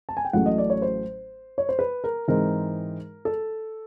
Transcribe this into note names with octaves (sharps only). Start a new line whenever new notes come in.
A5
G#5
G5
A1 A2 F#3 A3 C#4 F#5
D#5
D5
C#5
C5
C#5
C5
B4
A#4
G#2 E3 G#3 C4 D#4 A#4
A4